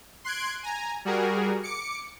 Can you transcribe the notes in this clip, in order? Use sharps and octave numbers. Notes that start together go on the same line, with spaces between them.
C6 F#6 G#6 D7
G#5 A#5
G3 F#4 G#4 A#4
D6 C#7